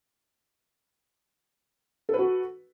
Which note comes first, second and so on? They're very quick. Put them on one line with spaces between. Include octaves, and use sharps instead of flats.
A4 B4 F#4